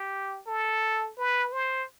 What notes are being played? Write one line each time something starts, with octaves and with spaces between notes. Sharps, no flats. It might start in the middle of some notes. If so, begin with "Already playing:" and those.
Already playing: G4
A4
B4
C5